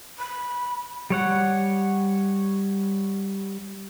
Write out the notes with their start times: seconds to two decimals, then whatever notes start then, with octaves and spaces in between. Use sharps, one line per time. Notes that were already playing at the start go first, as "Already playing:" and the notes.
0.19 B5
1.10 G3 C#5 F#5